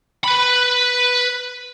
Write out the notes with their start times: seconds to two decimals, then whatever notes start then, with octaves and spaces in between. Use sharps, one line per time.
0.24 B4 B5